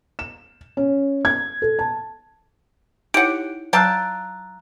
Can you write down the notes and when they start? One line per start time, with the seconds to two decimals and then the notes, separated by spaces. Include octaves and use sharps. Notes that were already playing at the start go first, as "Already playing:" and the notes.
0.19 E7
0.77 C#4
1.25 G#6
1.62 A4
1.79 A5
3.14 D#4 E4 G4 C#5 F#5 D7
3.73 F#3 F5 G5 A5 A#5 E6 F#6